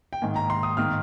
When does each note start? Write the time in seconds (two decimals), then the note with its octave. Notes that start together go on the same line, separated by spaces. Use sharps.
0.13 G5
0.22 G#2 D#3 A#3 G#5
0.36 A#5
0.50 C6
0.63 D#6
0.77 G#2 D#3 A#3 F6